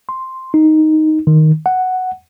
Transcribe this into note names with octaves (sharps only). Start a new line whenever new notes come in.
C6
D#4
D#3
F#5